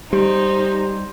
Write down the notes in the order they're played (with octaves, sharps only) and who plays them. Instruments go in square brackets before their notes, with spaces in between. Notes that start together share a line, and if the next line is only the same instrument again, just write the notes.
[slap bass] G3 [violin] D#4 [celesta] G4 [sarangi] C5